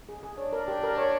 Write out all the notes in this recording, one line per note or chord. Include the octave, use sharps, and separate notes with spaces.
G#4
G#4
D4 C#5
A#4
G4
A#4
C#5